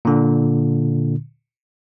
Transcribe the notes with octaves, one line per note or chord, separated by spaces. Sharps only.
A#2 D3